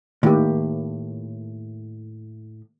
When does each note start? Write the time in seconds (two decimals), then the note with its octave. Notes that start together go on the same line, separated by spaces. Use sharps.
0.23 A2 D#3 A#3 G4